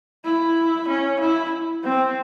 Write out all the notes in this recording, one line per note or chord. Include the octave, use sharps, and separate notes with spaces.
E4
C#4
E4
C4